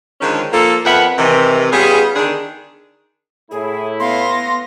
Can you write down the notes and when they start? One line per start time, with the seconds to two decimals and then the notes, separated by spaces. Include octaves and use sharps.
0.21 D3 D#3 F3 G#3 C#4
0.53 F3 A#3 F4 A4
0.85 F2 B3 A#4 B4 E5 F#5
1.18 C3 D#3 E3
1.73 G3 B3 C#4 F4 G#4
2.16 D3 D#3 D4 G#4
3.51 A2 E4 G#4
4.00 B3 F5 C6 A#6